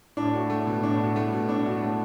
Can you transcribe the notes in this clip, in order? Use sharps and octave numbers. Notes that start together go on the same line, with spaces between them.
A2 D4
F#4
A3
B2
A2 D4
F#4
A3
B2
D4
F#4
A3